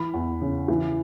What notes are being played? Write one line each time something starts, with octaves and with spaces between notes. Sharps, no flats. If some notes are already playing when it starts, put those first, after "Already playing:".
Already playing: E3 B5
E2
C#3
E3